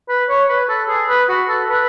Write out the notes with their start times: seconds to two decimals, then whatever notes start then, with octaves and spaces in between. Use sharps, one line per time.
0.09 B4
0.29 C#5
0.49 B4
0.69 A4
0.89 G#4
1.09 B4
1.29 F#4
1.49 A4
1.69 B4